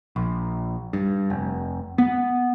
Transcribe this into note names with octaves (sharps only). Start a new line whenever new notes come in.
A#1
G2
F1
B3